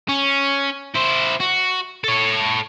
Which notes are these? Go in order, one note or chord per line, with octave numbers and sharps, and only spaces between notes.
C#4
E4 C5
F#4
A4 C#5